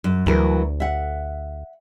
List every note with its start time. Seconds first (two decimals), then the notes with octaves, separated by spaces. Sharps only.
0.04 F#2
0.26 D2 E3 F#3 A#4
0.80 E5 F#5